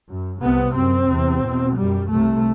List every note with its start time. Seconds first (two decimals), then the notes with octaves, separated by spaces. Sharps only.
0.09 F#2
0.42 C2 C3 B3
0.76 F#2 C4
1.09 E2 C3
1.43 E2 B2
1.77 F#2 G3
2.12 C2 C3 A3